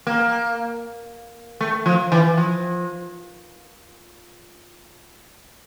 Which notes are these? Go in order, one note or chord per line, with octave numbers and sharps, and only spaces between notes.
A#3
A3
F3
E3
F3